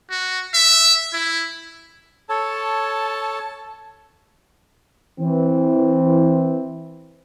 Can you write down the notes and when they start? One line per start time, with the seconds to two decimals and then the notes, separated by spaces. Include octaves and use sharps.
0.11 F#4
0.54 E5
1.13 E4
2.30 A4 C#5 A5
5.20 E3 C4